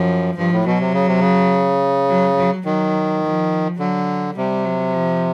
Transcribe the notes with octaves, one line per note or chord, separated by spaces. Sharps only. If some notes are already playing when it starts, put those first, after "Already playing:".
Already playing: F#2 F3
G2 F3
A2
B2 F#3
C3
C#3
C3
C#3
F#3
F#3
D#3 F#3
F3
D3 F#3
C3 G3
F#3
F3